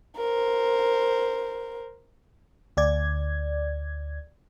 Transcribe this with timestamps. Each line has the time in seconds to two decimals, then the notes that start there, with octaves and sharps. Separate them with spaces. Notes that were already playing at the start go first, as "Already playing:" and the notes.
0.17 A#4 C5
2.77 D2 D5 G#6